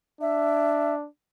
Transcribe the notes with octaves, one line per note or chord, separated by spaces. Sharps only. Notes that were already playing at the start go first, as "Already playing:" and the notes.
D4 E5